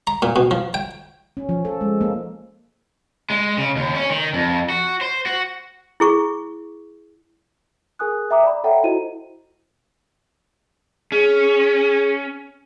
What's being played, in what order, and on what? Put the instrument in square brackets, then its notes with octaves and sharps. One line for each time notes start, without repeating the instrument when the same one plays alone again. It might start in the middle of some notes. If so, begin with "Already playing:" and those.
[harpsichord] A#5
A#2
B2
F3
G5
[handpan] C#4
F3
A4
G#3
A#3
[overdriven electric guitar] G#3
C#3
D#2
C#4
D#3
F2
F#4
C5
F#4
[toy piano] E4 G#4 C#6
[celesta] G#4 A#4 G#5 D#6 F#6
E5 G5 A#5 D6 D#6
D5 B5
A4 C#5 E5 F#5 G5 A#5
E4 F#4 C5 D#5 D#7
[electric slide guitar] C#4 [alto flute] G#4